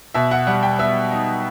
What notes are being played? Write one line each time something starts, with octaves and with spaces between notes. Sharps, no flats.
B2 E5
F#5
G3 F#5
G5
B3 E5
D#4